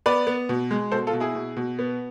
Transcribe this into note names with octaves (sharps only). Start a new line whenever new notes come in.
B3 B4 D5
B3
B2
G#3
B2 A4 C5
F4 A4
B2
E4 G#4
B2
B2
B3